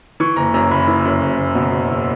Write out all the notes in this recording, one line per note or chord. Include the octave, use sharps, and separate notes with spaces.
E3 C#6
F#1 A#5
F#2 A#5
F#1 B5
E3
F#2
F#1
F#1
B2
F#1
E2